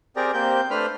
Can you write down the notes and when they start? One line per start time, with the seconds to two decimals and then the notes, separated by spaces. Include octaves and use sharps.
0.16 C4 G4 G#4 A#4 D5 A#5
0.34 A#3 C4 G4 G6
0.71 A3 D4 B4 C5 B5 F6